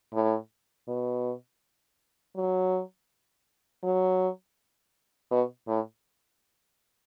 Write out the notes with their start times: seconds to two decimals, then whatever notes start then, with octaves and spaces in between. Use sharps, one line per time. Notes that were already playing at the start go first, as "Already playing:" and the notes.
0.14 A2
0.88 B2
2.36 F#3
3.83 F#3
5.31 B2
5.68 A2